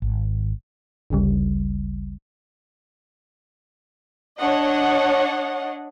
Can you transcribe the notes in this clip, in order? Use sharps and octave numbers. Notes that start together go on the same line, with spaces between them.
G#1
G#1 D2 C#3 G3
D4 C#5 D#5 F#5